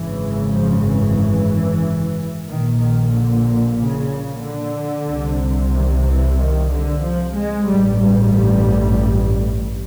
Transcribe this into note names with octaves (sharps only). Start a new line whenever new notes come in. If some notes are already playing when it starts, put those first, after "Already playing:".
Already playing: G#1 F#2 C#3 E3
F3
E3
A#1 A#2 D#3
D#3
D3
C#3
D3
C2 C3
D#3
E3
D#3
D3
F3
G#3
A1 G2 G3
G3